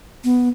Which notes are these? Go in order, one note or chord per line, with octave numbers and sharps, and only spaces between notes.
B3